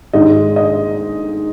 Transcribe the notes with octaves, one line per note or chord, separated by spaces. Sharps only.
G#2 D#3 G#3 D#5
D#5